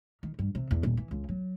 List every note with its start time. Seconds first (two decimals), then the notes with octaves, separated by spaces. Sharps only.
0.23 D#3
0.39 G2
0.55 C3
0.71 E2
0.83 D#1
0.97 E3
1.11 C#2
1.29 F#3